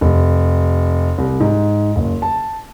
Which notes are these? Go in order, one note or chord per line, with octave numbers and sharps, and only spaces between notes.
F1
C2
G#2
F#1
A5